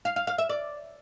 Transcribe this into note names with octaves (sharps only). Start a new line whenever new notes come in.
F5
F5
F5
E5
D5